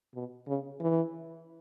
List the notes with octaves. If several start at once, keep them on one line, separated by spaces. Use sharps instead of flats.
B2
C#3
E3